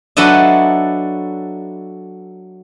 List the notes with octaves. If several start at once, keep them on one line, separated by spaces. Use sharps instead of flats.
F#3 D4 A4 B4 D#5 E5